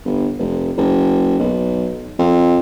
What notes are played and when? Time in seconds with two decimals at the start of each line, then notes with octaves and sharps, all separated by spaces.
0.05 G1
0.39 F1
0.77 F#1
1.39 B1
2.19 F2